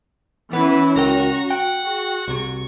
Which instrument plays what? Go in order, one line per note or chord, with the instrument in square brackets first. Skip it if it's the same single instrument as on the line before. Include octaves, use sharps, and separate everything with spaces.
[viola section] E3 E4 [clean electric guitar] B3 [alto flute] C#4 [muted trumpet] B4
[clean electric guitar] C#2 A#4 G5 [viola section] F#4 [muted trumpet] A#5
[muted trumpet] F#5 [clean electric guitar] G5
[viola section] F#4 [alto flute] G#4
[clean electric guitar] C2 C3 [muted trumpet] C#6